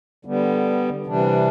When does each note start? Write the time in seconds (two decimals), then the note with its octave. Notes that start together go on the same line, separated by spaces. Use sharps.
0.25 D3 G3 B3
1.06 C3 E3 G3 D4